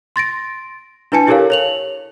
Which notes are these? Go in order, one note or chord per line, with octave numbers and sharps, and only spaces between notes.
C6 A6 A#6 D7
D4 E4 B4 G#5 A5 C#7
E4 G4 A4 A#4 C#5 F5
C#5 F7 F#7